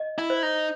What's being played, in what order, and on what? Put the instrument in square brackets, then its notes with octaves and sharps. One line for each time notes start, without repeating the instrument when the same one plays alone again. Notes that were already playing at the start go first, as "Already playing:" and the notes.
Already playing: [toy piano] D#5
[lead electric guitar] E4
[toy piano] C5
[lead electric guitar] D#4